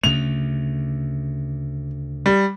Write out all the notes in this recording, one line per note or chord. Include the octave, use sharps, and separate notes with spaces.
D2 C#3 A3 F7
G3